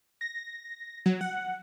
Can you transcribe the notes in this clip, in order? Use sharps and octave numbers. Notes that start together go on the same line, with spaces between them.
A#6
F#3
F#5